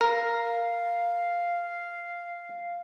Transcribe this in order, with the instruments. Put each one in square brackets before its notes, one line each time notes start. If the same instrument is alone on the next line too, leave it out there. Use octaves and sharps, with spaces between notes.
[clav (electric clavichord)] A#4 [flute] F5